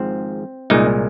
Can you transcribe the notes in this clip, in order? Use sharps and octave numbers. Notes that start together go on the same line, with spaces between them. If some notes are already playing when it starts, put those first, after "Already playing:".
Already playing: G#1 G#2 F3 C4
C2 A#2 G#3 D#4